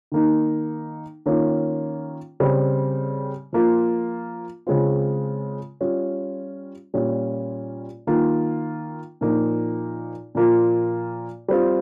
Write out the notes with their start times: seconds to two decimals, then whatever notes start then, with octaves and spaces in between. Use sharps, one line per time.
0.12 D#3 A#3 D#4
1.26 D#3 A#3 C#4 F4
2.40 C#3 G3 C4
3.53 F3 A#3 F4
4.67 C#3 G#3 C4 F4
5.81 G3 C#4 F4
6.94 A#2 G3 C#4 F4
8.07 D#3 A#3 F4
9.21 A#2 F3 A#3 D#4
10.35 A#2 F3 A#3 F4
11.48 G3 C4 F4